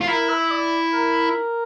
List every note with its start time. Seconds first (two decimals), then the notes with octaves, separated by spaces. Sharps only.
0.01 F4
0.08 E4 A#4
0.29 E5
0.51 D5
0.94 A#4